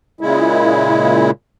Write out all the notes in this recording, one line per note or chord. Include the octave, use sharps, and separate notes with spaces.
A#2 C#3 G#3 E4